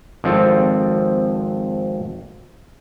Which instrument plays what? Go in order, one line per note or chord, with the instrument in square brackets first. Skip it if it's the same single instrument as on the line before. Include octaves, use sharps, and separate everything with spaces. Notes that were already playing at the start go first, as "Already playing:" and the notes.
[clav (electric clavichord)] G#1 F3 C4 A4